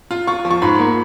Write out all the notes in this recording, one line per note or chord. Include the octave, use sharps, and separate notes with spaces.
F4
F4 C#6
F3
C#6
G#2 B5
A#3